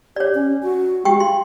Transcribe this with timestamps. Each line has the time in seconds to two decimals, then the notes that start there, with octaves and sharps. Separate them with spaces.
0.16 G4 C#5 D5
0.35 C#4
0.63 F#4
1.05 G#3 G4 G5 C#6
1.20 F5 C6